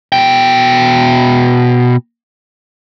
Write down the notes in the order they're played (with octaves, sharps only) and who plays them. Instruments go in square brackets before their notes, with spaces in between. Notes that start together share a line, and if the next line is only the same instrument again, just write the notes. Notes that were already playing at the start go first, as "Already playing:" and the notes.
[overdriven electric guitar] B2 G5